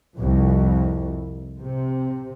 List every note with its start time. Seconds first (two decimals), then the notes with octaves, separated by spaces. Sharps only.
0.16 C2 F2
1.62 C3